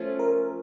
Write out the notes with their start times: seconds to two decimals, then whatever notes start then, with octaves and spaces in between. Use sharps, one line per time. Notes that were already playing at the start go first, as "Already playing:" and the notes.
Already playing: F3 A3 C#4 F4
0.19 A#4